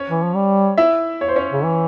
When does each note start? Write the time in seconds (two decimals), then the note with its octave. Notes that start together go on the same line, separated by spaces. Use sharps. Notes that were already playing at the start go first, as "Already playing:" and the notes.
Already playing: C#4 C#5
0.10 E3
0.23 F3
0.35 G3
0.78 E4 E5
1.21 C#5
1.28 C5
1.36 C#4 C#5
1.52 C#3
1.64 E3